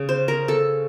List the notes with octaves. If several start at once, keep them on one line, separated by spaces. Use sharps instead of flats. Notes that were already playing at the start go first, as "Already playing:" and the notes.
Already playing: C#3
C5
A#4
A4